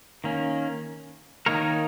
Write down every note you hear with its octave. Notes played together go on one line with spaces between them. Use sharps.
D#3 A#3 C#4
D#3 A#3 D#4 A#4 C#5